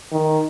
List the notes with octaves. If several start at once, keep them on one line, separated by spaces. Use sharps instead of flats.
D#3